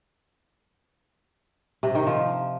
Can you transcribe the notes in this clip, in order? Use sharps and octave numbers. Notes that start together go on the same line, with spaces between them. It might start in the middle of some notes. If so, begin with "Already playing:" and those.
C3
D#3
F3